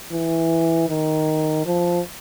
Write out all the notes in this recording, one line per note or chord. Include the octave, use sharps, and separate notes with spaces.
E3
D#3
F3